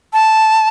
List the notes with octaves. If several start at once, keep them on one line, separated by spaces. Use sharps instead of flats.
A5